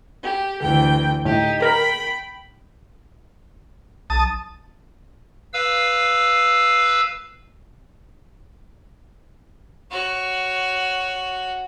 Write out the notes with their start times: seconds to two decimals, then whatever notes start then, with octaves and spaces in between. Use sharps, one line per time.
0.22 G4
0.61 D2 E3 G5
1.25 A2 D#4 G4
1.62 A#4 G5 B5
4.10 B1 A5 D#6
5.54 B4 F5 E6
9.92 F#4 C#5